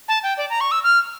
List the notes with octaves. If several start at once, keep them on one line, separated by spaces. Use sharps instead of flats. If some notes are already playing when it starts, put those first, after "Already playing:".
A5
G5
D5
A#5
C#6
E6
F6